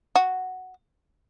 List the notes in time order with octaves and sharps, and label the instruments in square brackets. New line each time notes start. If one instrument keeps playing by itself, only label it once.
[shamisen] F#4